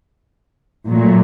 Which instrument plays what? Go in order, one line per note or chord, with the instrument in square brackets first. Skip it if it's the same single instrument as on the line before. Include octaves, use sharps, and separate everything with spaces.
[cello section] A#2 F#3 A3